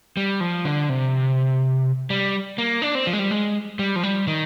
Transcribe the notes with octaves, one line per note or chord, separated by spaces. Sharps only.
G3
F3
D3
C3
G3
A#3
D4
C4
F3
G#3
G3
G#3
G3
F3
G3
D#3